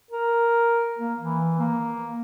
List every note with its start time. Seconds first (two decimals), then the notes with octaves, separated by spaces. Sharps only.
0.11 A#4
0.99 A#3
1.19 E3
1.59 A#3